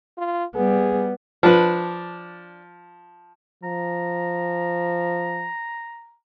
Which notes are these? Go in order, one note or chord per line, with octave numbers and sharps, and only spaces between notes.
F4
G3 B3 G#4
F3 D4 B4
F3 A#5